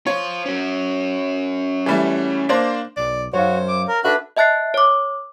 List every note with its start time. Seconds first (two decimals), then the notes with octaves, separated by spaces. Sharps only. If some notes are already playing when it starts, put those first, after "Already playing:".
0.07 F4 C5 C#5
0.46 C#4 F#4
1.86 E3 G3 A3
2.49 A#3 D4 C5
2.97 B1 D5
3.33 F#2 F#4 C5 C#5 F5
3.68 D6
3.88 A#4
4.04 D4 F#4 A4 B4 E5
4.37 D#5 E5 A5 F#6 A6 C7
4.74 C#5 D6